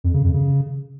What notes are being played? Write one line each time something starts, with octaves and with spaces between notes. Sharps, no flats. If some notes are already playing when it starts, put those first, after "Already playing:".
F2
C#3
F2
C#3